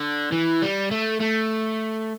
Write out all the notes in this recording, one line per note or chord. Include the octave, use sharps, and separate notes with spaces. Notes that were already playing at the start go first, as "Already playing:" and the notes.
Already playing: D3
E3
G3
A3
A3